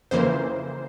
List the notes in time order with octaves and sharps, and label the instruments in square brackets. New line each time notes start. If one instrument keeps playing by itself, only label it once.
[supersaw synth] F2 C#3 E3 A#3 C5